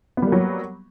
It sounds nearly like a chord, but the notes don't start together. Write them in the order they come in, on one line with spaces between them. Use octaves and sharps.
B3 G3 A#3 F#3